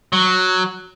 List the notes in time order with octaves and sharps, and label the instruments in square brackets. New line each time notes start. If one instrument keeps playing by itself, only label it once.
[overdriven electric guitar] F#3